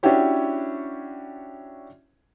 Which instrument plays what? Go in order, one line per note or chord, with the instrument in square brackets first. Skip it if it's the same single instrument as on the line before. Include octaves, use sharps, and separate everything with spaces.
[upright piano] C#4 D4 E4 F#4 G4 C#5